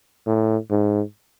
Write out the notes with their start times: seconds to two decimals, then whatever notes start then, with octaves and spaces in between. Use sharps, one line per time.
0.26 A2
0.70 G#2